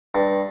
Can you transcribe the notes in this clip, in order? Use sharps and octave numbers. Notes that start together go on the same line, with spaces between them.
G2